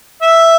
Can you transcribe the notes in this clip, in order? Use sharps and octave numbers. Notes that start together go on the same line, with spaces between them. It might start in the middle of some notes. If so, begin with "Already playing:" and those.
E5